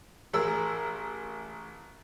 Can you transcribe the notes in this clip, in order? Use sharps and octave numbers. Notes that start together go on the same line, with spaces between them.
A1 G#4 A#4 E6